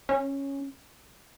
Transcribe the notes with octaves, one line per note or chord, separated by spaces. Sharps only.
C#4